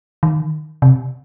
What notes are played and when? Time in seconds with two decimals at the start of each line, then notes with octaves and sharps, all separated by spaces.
0.23 D#3
0.82 C3